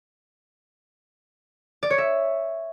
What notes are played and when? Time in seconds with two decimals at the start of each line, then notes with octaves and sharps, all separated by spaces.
1.83 D5
1.90 C#5
1.98 E5